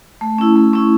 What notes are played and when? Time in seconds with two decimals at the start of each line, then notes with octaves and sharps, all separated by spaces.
0.21 A3
0.38 C#4 E4
0.56 A3
0.73 C#4 E4